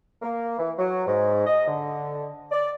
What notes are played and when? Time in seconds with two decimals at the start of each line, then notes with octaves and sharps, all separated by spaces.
0.22 A#3
0.58 E3
0.78 F#3
1.06 G#2
1.47 D#5
1.67 D3
2.52 D5